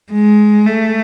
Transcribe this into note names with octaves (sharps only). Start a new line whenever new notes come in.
G#3
A3